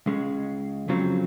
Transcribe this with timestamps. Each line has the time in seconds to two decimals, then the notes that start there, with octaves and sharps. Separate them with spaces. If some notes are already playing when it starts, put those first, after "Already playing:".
0.06 C#2 C#3 G#3
0.88 F2 C#3 F#3 C4 F4